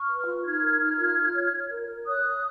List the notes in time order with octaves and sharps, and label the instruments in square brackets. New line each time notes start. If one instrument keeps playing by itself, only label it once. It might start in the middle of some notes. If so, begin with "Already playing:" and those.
Already playing: [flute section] C#6 F6
B4
F4
D#4 F6 G#6
A#4
D#4
F4
F4
C#5
C#5
A#4
A#4
C#5 D#6 F#6
C#5